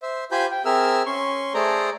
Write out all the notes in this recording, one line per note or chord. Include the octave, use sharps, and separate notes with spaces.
C5 E5
F4 G4 C5 G#5 B5 G6
G5
C4 G#4 A#4 E5 E6 F6
C#4 C6 C#6
A3 G#4 A4 C5 D5 A#5